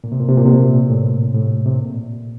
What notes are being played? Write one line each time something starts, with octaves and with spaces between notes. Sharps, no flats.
A#2
C3
A#2
C3
A#2
C3
A#2
A2
A2
C3
A#2